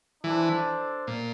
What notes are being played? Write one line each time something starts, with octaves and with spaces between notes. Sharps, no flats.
E3 D4 A4 C5
A#2